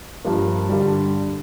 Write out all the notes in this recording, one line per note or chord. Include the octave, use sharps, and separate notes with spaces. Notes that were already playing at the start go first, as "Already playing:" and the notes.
G2 F3 A#3
G2 D3 G3